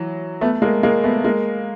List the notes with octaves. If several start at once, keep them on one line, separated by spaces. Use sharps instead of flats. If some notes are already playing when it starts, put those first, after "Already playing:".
Already playing: E3 F#3
A3 B3
G#3 A#3
G#3 A#3
A3 B3
G#3 A#3